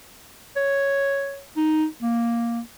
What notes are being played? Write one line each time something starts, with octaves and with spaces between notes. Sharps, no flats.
C#5
D#4
A#3